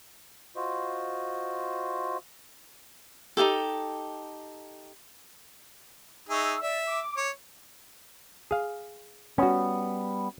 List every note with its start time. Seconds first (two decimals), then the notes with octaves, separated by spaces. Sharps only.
0.56 F4 F#4 C5 D#5
3.37 D#4 E4 G4 A4
6.29 D#4 G#4 E5 C#6 E6
6.61 D5 E5
6.87 D6
7.17 C#5
8.51 G#4 F5
9.38 G3 B3 C#4 F#4